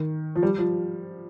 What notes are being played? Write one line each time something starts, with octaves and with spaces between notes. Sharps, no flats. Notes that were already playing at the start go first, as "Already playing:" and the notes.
Already playing: D#3
F3
G3
F3